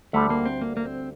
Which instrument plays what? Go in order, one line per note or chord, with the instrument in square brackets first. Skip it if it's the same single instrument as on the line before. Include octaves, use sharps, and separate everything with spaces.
[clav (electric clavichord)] D2 D3 G3 D4 A4 [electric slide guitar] A3
[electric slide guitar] A#3
C4
A#3
A#3
C4